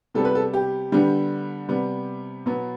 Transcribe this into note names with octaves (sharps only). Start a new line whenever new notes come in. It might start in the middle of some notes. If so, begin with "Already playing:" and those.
C3 G3 B3 A4
B4
A4
G4
D3 G3 B3
C3 G3 B3
B2 F#3 B3